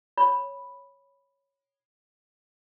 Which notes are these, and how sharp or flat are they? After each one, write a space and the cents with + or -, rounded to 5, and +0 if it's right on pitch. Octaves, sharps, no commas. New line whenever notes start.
C#5 +0 B5 +0